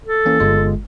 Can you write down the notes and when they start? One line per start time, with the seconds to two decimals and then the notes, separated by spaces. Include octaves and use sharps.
0.06 A4
0.26 E3 A#3 C#4
0.40 G1 G#3 F4